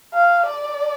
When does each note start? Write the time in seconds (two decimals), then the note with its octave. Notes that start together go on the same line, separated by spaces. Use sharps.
0.13 F5
0.46 D5